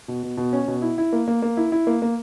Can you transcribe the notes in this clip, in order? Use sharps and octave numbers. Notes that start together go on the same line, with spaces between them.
B2
B2
B2
C#4
B2
E4
E4
A#3
A#3
A#3
E4
E4
A#3
A#3